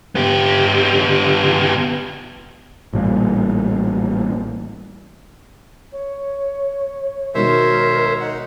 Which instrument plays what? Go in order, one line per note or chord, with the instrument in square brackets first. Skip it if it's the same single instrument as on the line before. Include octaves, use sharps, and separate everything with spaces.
[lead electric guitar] B3 G4
[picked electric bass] A1 A#2 G3 A#3
[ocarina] C#5
[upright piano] B2 D#3 G#3 [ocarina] F#4 [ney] A#4 [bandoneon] C5 C#5 E5
[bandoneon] D#4 F#5